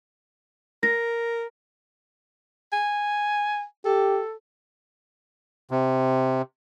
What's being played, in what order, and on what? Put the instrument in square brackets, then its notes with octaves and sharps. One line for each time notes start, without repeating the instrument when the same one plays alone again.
[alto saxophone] A#4 [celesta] A#6
[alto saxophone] G#5
[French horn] G4 [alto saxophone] A4
[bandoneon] C3